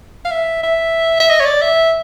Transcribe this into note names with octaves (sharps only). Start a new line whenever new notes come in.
F5
E5
E5
E5
D#5
C#5
D5
E5